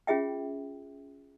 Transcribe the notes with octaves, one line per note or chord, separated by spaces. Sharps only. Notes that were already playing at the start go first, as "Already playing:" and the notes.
C#4 F4 G#4 E5 G5